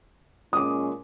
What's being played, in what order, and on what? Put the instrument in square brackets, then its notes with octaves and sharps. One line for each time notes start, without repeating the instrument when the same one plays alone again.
[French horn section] A#2 G#3 C#4 [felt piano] D6 D#6